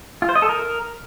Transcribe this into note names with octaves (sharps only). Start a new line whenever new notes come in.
F4
C5
D#5
A4
A#4